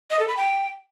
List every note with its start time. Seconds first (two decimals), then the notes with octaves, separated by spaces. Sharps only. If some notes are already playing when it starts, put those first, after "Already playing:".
0.11 D#5
0.19 A4
0.28 B5
0.37 G5